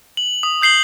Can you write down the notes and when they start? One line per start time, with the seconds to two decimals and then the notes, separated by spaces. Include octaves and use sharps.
0.17 F#7
0.43 D#6
0.61 D#6 G6 C7 F#7 G7